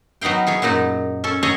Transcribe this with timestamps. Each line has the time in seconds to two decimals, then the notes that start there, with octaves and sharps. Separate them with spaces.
0.21 F#3 B3 D#4 F5 G5
0.47 E3 G#4 C#5
0.62 F#2 A#2 F#3 D#4
1.24 C#4 A4
1.43 G#4 A4 C#5 D#5 G#5 A#5